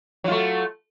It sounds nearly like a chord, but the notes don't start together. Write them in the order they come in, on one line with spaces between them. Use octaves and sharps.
F#3 F4 A3